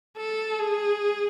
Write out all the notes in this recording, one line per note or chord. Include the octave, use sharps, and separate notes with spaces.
A4
G#4